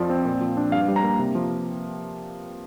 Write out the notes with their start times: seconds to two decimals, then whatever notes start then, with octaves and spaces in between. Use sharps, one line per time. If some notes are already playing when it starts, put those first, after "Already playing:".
Already playing: F2 F3 D5
0.10 C4
0.25 A#2
0.41 F3
0.57 D4
0.72 G2 F5
0.88 G3
0.96 A#5
1.03 A#3
1.19 C3
1.35 F3